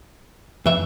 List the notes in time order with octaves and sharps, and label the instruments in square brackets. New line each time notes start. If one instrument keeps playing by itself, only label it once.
[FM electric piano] F2 [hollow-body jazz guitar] E3 E5